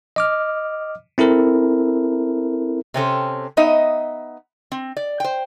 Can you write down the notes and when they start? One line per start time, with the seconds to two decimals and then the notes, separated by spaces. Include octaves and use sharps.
0.16 D#5 D6 F6
1.18 C4 E4 A4 A#4
2.94 C3 C4 C#4 A4
3.57 B3 D#4 D#5 E5
4.72 C4
4.97 D5
5.20 C5 G5